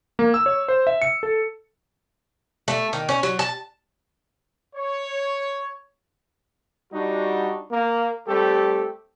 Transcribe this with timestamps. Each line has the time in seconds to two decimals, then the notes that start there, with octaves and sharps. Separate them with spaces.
0.19 A#3
0.34 E6
0.46 C#5
0.68 C5
0.87 E5
1.02 C#7
1.23 A4
2.68 A3
2.93 D#3
3.09 C#4
3.23 F#3
3.39 A5
4.76 C#5
6.93 G3 D4 D#4 F#4
7.71 A#3
8.28 G3 A3 C4 G4 A4